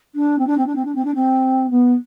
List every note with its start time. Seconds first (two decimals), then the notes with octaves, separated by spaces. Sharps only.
0.15 D4
0.38 C4
0.46 D4
0.57 C4
0.66 D4
0.75 C4
0.85 D4
0.95 C4
1.04 D4
1.14 C4
1.70 B3